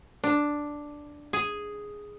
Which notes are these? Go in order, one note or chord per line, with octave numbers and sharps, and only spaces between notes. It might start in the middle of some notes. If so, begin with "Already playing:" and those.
D4
G#4